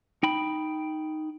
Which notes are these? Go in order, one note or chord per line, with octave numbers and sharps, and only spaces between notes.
D#4 G5 B5